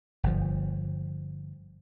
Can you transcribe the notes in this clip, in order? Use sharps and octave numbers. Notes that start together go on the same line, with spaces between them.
G1 F3